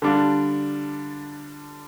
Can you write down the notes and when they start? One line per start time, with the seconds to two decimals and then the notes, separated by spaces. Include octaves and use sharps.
0.02 D3 G3 D4 F4